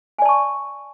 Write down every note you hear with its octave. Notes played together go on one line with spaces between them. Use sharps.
D5 G#5 A5 C#6